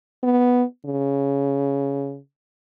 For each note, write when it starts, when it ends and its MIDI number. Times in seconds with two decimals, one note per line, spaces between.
0.23 0.63 59
0.85 2.18 49